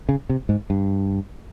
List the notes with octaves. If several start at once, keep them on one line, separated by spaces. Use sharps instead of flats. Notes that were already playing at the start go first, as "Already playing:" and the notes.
C#3
C3
G#2
G2